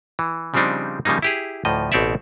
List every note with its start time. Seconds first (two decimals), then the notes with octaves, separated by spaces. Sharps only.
0.19 E3
0.54 C#3 F3 G3 C4 D4 D#4
1.05 C#3 F3 G3 A#3 D#4
1.22 E4 G4 G#4
1.65 D2 A2 F3 D#5
1.92 A1 B2 C4 C#5 D5 E5